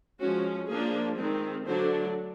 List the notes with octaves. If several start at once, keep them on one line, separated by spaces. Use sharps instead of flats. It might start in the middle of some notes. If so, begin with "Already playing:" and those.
F3 G#3 C#4 F#4
F3 A#3 D4 G#4
D#3 G#3 C4
D3 F#3 A3 D4 C5